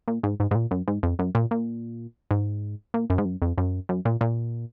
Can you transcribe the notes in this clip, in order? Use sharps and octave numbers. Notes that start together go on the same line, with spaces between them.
A#2
G#2
G#2
G#2
A#2
F#2
G#2
F2
F#2
A#2
A#2
G#2
A#2
F#2
G#2
F#2
F2
F#2
F#2
A#2
A#2